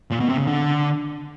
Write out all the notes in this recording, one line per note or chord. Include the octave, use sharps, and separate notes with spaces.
A#2
B2
C3
C#3
D3